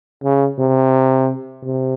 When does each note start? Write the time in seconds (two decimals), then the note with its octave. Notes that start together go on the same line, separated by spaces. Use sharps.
0.23 C#3
0.58 C3
1.63 C3